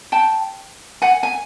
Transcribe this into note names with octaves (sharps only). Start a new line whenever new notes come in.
G5 A5
F#5 G#5
G#5